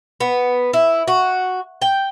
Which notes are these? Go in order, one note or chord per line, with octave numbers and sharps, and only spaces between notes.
B3
E4
F#4
G5